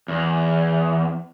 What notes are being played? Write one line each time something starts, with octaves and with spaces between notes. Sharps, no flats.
E2